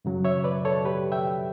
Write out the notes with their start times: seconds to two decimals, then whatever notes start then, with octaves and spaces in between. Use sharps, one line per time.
0.05 F#2 C#3 F#3
0.25 C#5 E5
0.44 B4 D5
0.65 A4 C#5
0.85 G4 B4
1.12 E5 G5